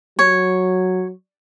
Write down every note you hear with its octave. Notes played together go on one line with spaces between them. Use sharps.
F#3 C#5